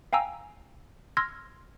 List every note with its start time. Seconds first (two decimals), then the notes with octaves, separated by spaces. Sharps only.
0.13 F5 G5 G#5 A#5 E6
1.17 C6 E6 F6 G#6 A#6